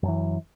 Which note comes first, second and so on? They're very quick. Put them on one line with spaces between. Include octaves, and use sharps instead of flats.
F#2 F#3 E3